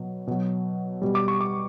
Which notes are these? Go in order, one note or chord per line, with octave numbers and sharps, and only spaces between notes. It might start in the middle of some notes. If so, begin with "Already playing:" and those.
Already playing: B2 F#3
B2 F#3
B2 G3
D6
C#6
D6